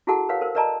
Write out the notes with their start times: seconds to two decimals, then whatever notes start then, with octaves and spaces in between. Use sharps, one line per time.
0.07 E4 F#4 G#4 A4 F#5 A5
0.29 A#4 B4 C#5 F5 F#5
0.41 A4 A#4 C5
0.55 A#4 B4 D5 D#5 A5 A#5